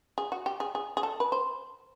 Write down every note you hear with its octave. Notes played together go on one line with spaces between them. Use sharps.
G#4
F#4
G4
G#4
G#4
G#4
A4
B4
C5